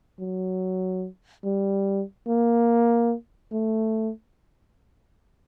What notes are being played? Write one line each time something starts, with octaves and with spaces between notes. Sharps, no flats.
F#3
G3
A#3
A3